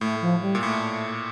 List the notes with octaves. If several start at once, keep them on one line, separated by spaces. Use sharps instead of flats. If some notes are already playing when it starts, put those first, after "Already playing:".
A2 A3
F3
G3
A#2
A2 A3